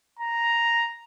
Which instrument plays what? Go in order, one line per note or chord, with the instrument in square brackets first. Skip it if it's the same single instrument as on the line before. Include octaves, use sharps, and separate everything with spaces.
[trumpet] A#5